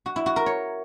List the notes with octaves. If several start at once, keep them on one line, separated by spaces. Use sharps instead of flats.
F#4
E4
F#4
A#4
C#5